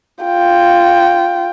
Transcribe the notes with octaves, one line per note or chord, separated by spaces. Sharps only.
F4 G5